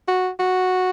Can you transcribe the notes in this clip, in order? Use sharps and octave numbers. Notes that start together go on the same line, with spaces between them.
F#4
F#4